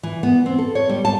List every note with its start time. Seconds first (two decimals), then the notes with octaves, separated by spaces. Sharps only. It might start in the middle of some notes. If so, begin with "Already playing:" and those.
0.03 E3
0.23 B3
0.46 C4
0.58 A4
0.75 C#5
0.89 G3
1.05 A5